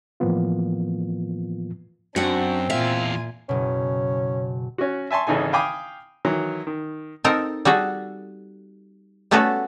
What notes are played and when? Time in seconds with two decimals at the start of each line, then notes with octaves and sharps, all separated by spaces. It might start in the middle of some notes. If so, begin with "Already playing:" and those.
0.20 A2 E3 F3 A#3 B3 F4
2.16 F#2 C4 D4 F#4 F#5
2.70 E2 A#2 F4 E5 F5 G#5
3.49 F#1 B2 C#4
4.78 C#4 F#4
5.11 E5 G#5 A5 C6 C#6
5.27 G#1 C#3 E3 D#4 A4 G#5
5.53 F5 G5 G#5 B5 D6 D#6
6.25 D#3 E3 F#3
6.67 D#3
7.24 C4 D#4 A4 A#4
7.65 G3 F#4 G#4 A4
9.31 G3 A3 B3 C#4 F#4 A4